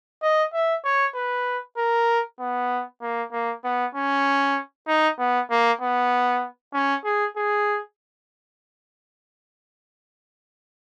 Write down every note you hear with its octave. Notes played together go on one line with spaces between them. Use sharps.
D#5
E5
C#5
B4
A#4
B3
A#3
A#3
B3
C#4
D#4
B3
A#3
B3
C#4
G#4
G#4